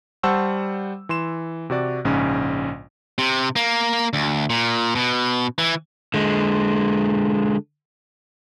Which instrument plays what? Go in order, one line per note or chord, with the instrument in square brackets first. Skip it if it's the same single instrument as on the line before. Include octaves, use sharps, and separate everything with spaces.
[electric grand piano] G3 C5 F#5 A5 C#6 E6
E3 C6 E7
C3 F#4 D5
A#1 G#2 C#3 C#4
[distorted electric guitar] C3
A#3
D2
A#2
B2
E3
[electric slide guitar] D3 G#3